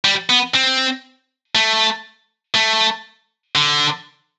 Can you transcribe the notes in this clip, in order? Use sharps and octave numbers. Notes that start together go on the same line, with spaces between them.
G3
B3
C4
A3
A3
D3